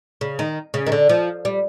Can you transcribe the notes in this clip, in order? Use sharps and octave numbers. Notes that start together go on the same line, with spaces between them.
C#3
D#3
C#3
D#3
D3
F3
G3